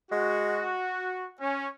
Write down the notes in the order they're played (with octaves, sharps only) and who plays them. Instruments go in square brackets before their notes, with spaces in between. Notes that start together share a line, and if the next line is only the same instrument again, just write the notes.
[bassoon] G#3 [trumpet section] F#4
[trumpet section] C#4